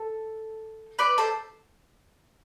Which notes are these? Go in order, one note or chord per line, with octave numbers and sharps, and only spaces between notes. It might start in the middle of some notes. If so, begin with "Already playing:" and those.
Already playing: A4
B4 D5
A4 C5